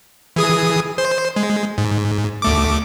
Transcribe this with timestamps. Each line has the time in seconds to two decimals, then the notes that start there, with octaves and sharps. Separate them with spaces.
0.36 E3 G#4 D#6
0.98 C5
1.36 G#3
1.78 G#2
2.42 D2 A3 D6